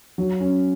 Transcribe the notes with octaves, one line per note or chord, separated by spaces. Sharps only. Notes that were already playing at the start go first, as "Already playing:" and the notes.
F#3
C#4